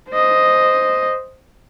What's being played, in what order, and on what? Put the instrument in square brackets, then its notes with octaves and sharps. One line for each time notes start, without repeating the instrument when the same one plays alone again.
[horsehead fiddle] C5 D#5